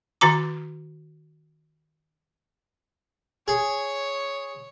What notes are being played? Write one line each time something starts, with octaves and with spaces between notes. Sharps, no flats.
D#3 F#4 A#5 D6
G#4 C#5